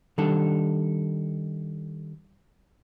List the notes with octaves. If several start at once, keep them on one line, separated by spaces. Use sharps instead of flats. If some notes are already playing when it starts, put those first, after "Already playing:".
D#3 G3 D4 A4